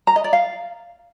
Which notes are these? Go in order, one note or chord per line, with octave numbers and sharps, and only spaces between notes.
A#5
D#5
D5
F5